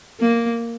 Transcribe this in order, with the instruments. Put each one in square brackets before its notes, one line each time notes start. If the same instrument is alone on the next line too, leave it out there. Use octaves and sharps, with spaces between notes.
[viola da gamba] A#3